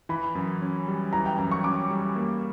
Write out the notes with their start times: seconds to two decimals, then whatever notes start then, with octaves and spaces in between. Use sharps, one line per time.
0.09 E3 B5
0.35 F#2
0.62 C#4
0.88 G3
1.13 E3 A#5
1.26 G5
1.38 F#2 A#5
1.51 C#6
1.64 C#4 D6
1.91 G3
2.16 A#3